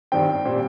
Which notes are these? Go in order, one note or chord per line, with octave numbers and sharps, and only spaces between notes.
G2 D#3 G3 C4 G5
A#2 G3 C4